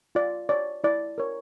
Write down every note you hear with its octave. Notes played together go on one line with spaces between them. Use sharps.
F4 D5
C#5 D5
E4 D5
A#4 C#5